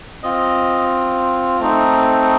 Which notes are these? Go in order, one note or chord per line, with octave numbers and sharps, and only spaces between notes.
C4 F4 D#5
A3 C4 D#4